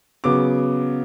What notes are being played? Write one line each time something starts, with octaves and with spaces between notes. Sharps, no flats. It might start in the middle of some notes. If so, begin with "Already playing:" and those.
C#3 F#3 B3 D6